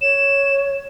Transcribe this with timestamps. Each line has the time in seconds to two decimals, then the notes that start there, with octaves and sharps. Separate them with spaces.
0.01 C#5 E7